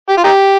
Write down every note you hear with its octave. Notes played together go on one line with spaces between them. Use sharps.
G4
F4
D#4 G4